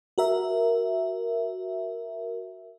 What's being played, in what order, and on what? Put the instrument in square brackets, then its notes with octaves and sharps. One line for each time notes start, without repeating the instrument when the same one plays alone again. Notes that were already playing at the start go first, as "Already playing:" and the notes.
[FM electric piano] F#4 A#4 E5